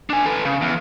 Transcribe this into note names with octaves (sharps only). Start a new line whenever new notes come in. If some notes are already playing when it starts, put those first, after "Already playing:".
D4 G#5
A4 B4
C#3
E2